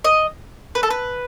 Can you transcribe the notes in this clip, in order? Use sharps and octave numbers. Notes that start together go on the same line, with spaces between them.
D#5
B4
A4
B4